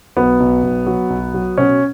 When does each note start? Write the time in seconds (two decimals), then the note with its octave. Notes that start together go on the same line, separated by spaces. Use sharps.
0.17 B1 B3
0.40 B1
0.63 B1
0.86 F#3
1.10 B1
1.34 F#3
1.57 B2 C#4